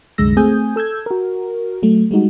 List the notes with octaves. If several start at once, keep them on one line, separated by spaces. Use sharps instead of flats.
C2 F#2 D3 G#3 E6 A#6
A3 C4 G#4 G#5 D#6 G6
A4 E6 G6 G#6
F#4 A#4
F#3 A3
G3 G#3 D#4 F#4